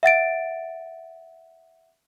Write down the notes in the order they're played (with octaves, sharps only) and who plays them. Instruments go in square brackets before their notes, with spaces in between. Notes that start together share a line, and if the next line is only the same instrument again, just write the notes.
[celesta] E5 F#5 A6 D7